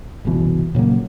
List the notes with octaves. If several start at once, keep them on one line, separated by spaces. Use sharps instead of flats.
F#1 C2 B2 E3
A#2 C#3 F#3 A#3